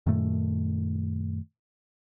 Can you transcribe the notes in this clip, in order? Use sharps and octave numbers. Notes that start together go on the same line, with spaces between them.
F#2 A#2 D#3 A3